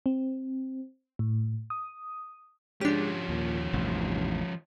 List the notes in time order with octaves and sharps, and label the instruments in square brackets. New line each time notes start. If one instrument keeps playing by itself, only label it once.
[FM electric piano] C4
A2
D#6
[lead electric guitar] F3 C#4 [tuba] G#3 [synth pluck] D4 G4
[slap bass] D#2 [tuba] A#2
[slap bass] A1 E2 C3 [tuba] G2